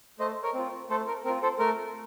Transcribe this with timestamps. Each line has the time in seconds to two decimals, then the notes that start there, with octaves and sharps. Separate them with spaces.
0.19 A3 C5 D#5
0.43 A#4 C#5
0.54 C4 F4
0.90 A3 A4 C5
1.07 A#4
1.25 C4 A#4
1.29 F4
1.42 A4 C5
1.59 A3 A#4